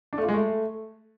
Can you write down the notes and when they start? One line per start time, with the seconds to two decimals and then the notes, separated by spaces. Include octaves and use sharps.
0.13 D4
0.18 A3
0.23 F4
0.28 G#3
0.34 A3